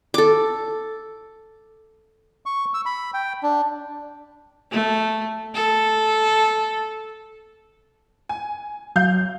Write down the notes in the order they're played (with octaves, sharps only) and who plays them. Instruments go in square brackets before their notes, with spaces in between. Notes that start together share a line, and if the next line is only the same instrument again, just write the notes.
[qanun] A4 D6
[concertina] C#6
E6
B5
G5
D4
[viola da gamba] A3
A4
[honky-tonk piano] G#5
[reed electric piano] F#3 [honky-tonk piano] F5 G6